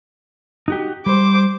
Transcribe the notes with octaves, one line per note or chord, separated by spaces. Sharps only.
D#4 F#4 G4
G3 C5 D6